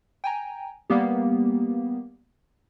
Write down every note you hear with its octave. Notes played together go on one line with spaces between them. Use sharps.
G5 G#5 A#5
G3 A#3 B3 G4